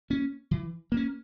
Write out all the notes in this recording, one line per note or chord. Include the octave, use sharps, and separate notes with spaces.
A#3 C#4
E3
A#3 C#4